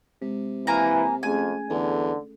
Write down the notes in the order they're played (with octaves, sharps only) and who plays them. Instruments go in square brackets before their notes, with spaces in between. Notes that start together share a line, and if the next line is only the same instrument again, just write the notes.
[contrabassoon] C3 [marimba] G#3
[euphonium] E3 [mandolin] A#3 G#5 A#5
[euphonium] F2 [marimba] A3 C#4 G#4 [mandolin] G#5
[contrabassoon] E2 [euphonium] D3 [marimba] A4